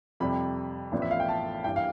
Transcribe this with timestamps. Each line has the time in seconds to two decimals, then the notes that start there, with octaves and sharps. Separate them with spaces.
0.20 F2 C3 G3 B5
0.92 A1 A2 F3 B3 D4
1.02 E5
1.11 F5
1.20 G5
1.29 A5
1.64 G2 E3 G3 G5
1.76 F5